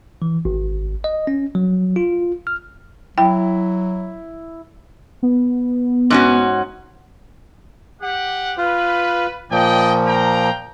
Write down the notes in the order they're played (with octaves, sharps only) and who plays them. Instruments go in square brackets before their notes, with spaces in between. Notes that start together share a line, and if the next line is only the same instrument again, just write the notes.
[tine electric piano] E3
G#1
D#5
C#4
F#3
F4
F6
[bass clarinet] F#3 [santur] E4 [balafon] G5
[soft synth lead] B3
[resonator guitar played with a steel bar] G#2 C#4 F#4
[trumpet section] G4 F#5
[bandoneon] F4 [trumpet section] B4
[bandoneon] A#2 F3 [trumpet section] D5 D#5 G5
[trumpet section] F5 G5 A#5